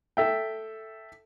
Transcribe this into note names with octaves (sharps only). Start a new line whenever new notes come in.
A4 E5 G5